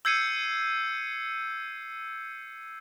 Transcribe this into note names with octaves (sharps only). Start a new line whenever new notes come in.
E6 G6 G#6 C7 C#7 D#7